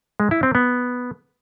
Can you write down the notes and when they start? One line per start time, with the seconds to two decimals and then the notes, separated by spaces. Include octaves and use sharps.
0.20 G#3
0.31 E4
0.43 C4
0.55 B3